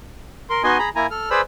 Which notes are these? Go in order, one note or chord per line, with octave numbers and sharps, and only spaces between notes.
A#4 C6
B3 D#4 F#4 D#5 G#5 C6
G#4 A#5 B5
A#3 E4 G#5 A#5
A4 F6
G#4 B4 C5 D5 B5 E6